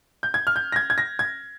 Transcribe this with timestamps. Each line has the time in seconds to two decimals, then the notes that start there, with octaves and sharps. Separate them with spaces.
0.23 G6
0.34 G#6
0.47 F6
0.56 G6
0.72 A#6
0.76 G#6
0.90 G#6
0.98 A#6
1.19 G#6